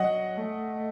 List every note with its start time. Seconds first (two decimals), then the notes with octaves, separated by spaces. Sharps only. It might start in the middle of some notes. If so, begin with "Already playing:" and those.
Already playing: F#3 D#5 F#5
0.37 A3